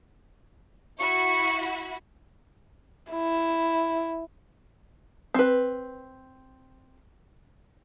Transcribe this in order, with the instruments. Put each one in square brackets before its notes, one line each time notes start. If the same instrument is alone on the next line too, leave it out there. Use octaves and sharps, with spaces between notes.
[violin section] E4 F#4 B5 [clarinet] C#6
[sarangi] E4
[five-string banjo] C4 B4